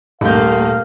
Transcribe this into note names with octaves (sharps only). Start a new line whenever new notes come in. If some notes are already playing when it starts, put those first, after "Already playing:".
D#1 A3 A#3 F5 G6